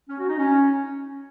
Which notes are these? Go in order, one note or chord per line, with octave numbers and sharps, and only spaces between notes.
C#4
F#4
D#4
C#4